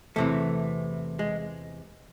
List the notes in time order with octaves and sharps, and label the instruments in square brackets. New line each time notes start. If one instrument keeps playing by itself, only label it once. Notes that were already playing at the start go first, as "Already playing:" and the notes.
[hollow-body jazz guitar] E2 C3 E3 A3
G#3